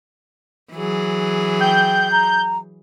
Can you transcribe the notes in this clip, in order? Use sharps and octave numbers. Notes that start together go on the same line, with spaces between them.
E3 F#3 G#4
G5 G6
A#5